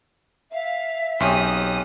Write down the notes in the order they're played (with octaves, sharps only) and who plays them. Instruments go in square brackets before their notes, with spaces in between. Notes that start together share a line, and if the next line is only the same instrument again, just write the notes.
[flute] E5 [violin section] F5
[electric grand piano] B1 [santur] C4 C#4 G4 [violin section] D#6